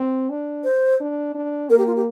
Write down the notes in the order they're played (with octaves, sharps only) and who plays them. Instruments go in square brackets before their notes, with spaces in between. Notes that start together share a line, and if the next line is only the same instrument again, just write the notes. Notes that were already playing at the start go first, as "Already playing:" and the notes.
Already playing: [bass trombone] C4
D4
[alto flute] C5
[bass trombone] D4
D4
[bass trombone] A#3 [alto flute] A#4
[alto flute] G4
F4
G4